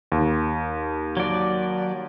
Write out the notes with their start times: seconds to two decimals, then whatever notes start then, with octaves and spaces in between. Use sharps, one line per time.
0.12 D#2
1.17 F#3 D5